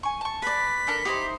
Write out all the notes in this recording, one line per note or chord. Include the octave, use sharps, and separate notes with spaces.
G#5 C#6
A5 C#6
B4 D5 B6
D4 A4 A#4
D#4 E4 G4 C5